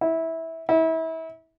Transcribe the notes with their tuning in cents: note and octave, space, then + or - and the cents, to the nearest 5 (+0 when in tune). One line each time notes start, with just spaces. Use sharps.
E4 -15
E4 -30